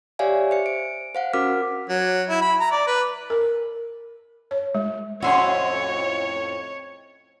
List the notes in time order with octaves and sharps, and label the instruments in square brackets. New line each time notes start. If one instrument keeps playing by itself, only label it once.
[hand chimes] G4 C#5 D5 E5 F5 G#5
C5 C#7
D7
C5 F5 F#5
C#4 F#4 A#4 D6 F6 B6
[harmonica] F#3
E4
B5
A#5
D5
B4
[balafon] A#4
C#5
G#3
[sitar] F2 A2 C#4 [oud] F#4 [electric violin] C#5 [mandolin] E5 C6